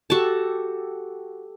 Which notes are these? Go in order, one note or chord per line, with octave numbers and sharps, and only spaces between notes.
F#4 G4 A4 A5